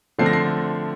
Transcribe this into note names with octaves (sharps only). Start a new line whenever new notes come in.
D3 F3 A3 C4 C7
A#6
C7